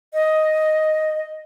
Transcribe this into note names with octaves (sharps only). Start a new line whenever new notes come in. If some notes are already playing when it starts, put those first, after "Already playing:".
D#5